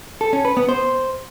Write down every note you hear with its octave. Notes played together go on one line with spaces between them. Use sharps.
A4
C#4
B4
B3
C5